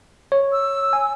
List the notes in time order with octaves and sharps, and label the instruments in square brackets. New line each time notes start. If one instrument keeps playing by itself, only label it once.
[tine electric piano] C#5
[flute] E6
[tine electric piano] G#5